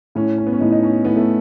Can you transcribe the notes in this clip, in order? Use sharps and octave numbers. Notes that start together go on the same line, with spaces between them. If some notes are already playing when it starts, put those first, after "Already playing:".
A2 C#4
C#4
B3
C#4
A2 D#4
D#4
C#4
A2 B3
A3